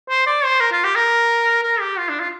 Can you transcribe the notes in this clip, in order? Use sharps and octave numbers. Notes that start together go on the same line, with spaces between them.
C5
D5
C5
A#4
F4
G4
A#4
A#4
G4
F4
D4
F4